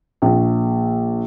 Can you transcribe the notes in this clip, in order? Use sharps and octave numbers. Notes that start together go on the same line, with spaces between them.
A#1